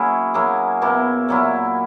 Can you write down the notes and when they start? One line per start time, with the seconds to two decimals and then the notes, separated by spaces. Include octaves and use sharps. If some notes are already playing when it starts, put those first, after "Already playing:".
Already playing: F#3 A#3 C#4 E4 G#4
0.34 F#3 A#3 E4 G#4
0.82 B2 A#3 E4
1.29 A#2 F#3 A#3 E4